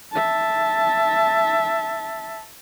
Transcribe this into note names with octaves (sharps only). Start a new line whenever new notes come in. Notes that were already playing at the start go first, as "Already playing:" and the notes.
E5 A5